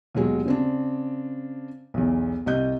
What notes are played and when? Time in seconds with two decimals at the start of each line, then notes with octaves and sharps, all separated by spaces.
0.15 D#2 B2 F#3 G#3
0.46 C#3 C4 D4
1.94 B1 E2
2.46 C2 D#5 G6